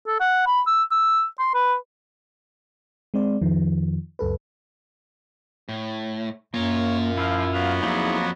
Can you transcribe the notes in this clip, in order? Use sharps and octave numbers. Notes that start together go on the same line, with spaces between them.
A4
F#5
B5
E6
E6
C6
B4
G#3 C4 D5
F2 D#3 F3
C#2 F#2 A4 B4
A2
F#2 A#3 F4 A#4 C#5
F3 E4 F5
F#3 B3 F5
F2 A#3 D#4 E4 G#4